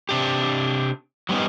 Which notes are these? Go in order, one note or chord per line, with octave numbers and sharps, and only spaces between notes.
C3 D4 G4
F#3 G3 B3 C#4 D#4